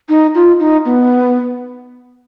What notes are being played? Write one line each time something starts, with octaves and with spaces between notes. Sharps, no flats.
D#4
F4
D#4
B3